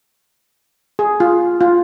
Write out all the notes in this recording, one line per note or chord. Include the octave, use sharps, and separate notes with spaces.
G#4
F4
F4